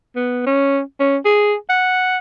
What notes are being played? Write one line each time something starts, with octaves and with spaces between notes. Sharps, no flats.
B3
C#4
C#4
G#4
F#5